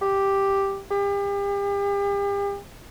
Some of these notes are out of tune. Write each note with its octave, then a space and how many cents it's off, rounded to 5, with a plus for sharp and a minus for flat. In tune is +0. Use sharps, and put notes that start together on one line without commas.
G4 +0
G4 +40